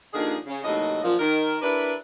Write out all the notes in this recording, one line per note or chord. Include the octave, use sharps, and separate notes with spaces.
D#2 D3 D#3 F3 G#4
C#3
D#2 A2 C3 F#3 D#5
F#2 A#2 F3
D#3 A#4
D4 E4 G4 A#4 B4 D5